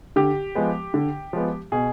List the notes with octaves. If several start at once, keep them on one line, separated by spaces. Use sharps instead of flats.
D3 G4
F3 G#3 B3
D3
F3 G#3 B3
B2 G#4